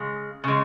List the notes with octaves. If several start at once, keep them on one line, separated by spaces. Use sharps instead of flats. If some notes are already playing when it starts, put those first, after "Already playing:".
Already playing: C#3 G#3
C#3 G#3